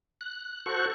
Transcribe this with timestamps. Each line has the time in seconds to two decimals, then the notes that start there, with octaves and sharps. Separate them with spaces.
0.21 F#6
0.66 F#4 A4 C5 C#6 F#6